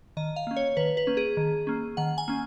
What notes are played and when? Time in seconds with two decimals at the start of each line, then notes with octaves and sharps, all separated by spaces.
0.17 D#3 D#5
0.36 F5
0.47 A#3 C#4
0.57 C#5
0.77 D#3 B4
0.97 B4
1.07 A#3 C#4
1.17 G#4
1.37 D#3
1.67 A#3 C#4
1.97 D#3 F#5
2.18 G#5
2.28 A#3 C#4